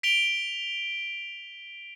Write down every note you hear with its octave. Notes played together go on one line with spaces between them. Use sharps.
B6 D7 F7 G7